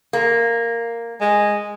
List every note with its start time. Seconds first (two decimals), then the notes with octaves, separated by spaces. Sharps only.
0.13 A#3
1.21 G#3